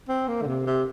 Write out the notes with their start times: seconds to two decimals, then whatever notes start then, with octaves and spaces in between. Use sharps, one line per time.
0.08 C4
0.28 A#3
0.42 D3
0.47 C3
0.66 C3